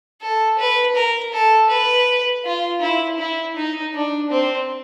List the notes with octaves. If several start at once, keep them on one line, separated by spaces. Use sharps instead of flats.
A4
B4
A#4
A4
B4
F4
E4
E4
D#4
D4
C4